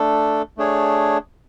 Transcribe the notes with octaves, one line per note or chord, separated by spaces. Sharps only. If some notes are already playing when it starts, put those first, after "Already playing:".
Already playing: A3 D4 A4
A3 D4 G#4 C#5